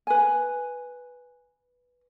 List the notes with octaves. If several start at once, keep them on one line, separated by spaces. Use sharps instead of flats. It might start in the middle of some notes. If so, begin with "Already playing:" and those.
B4 G#5